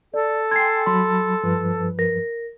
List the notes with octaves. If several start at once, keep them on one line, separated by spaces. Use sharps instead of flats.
A4 D5
G5 G#5 C6 G#6 C7
F#3 B5 C6
G2 F3 B4
A#4 A#6